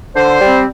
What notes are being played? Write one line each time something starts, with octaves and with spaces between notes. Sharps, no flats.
D3 C5
G3 C4